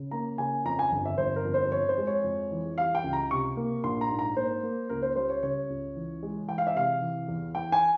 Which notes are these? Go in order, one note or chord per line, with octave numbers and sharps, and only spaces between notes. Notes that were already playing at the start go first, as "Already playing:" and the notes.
Already playing: C#3
A#3 A#5
C#3 G#5
F2 A#5
G#5
G1
E5
G1 C5
A#4
F2
C5
F2 C#5
C5
G#3
C#5
F2
E3
G3 F5
G5
C#2
A#5
C3 C#6
A#3
A#1 C6
A#5
G#2
A#5
A#3 C5
A#3
C#2 A#4
C5
G3 C5
C#5
C#3 C#5
C#2
E3
G#3
E3 G5
F5
E5
C3 F5
E3
E2
E3 G5
G#5